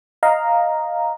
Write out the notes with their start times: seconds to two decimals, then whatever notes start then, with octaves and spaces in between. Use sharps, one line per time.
0.23 D#5 F5 A#5